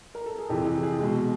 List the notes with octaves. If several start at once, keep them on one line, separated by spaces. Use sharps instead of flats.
A#4
A4
G#4
F2 C3 E3 G4
G#4
G#4
B2 G#3